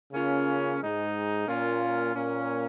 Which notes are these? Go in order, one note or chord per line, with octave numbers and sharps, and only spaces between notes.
C#3 A#3 C#4 F4
G#2 G#3 D#4
A#2 A#3 C#4 F4
A#2 A#3 C#4